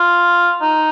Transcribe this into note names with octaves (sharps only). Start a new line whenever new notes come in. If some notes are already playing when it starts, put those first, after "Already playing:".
Already playing: F4
D#4